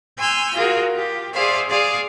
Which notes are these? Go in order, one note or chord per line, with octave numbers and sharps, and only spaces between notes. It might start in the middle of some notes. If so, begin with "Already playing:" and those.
G#5 C6 C#6 E6 F6 G6
F4 F#4 G#4 A#4
F4 G4
G#4 C5 D5 E5 F5
G#4 D5 F5